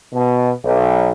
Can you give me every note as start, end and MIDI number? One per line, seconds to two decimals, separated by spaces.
0.12 0.50 47
0.64 1.10 35